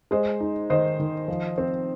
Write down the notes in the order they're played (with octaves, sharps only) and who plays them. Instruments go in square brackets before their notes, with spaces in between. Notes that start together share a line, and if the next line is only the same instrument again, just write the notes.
[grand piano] G#3 [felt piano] C5 D#5
[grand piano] D#4
[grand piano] D#3 [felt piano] C5 D#5
[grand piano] D#3
F3
C4